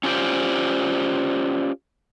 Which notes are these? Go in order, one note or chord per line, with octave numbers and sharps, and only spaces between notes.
C#4 D4 F4 G4 C5 D5